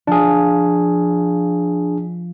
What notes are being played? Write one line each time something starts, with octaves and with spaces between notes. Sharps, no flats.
F3 D4 G#4